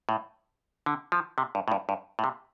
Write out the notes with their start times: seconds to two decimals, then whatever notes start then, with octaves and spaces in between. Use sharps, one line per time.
0.09 A2
0.86 D3
1.12 F3
1.38 C3
1.55 G2
1.68 A2
1.72 G2
1.89 G2
2.19 A2
2.24 C3